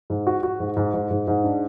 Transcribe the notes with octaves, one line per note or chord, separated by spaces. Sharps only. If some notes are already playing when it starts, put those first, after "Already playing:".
G#2
F#4
F#4
G#2
G#2
G#2
G#2
G#2
D4